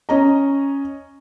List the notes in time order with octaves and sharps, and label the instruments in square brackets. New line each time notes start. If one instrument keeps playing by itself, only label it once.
[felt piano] C#4 D#5 A#5